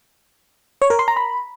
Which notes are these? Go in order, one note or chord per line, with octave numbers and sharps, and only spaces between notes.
C#5
A#4
C6
A#5
B5